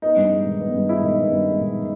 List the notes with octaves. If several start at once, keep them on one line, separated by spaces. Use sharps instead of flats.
B3 D#4
G2
G#3
D#3
B3
G2
G#3 E4
D#3
B3
G2
G#3
D#3